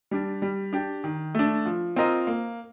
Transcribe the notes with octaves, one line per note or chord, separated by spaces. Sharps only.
G3 D4
G3
D4 G4
D#3
A3 D4
F3
C4 F4 A#4 D#5
A#3